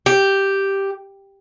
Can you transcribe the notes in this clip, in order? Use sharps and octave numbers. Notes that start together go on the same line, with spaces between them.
G4